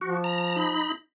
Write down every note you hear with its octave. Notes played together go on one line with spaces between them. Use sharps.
F3 F#4
A#5
D#4 B5